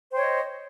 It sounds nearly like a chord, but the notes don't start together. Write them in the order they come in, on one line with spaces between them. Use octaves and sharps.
C5 G5 C#5 D#5